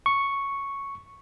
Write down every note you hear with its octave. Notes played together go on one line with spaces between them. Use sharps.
C#6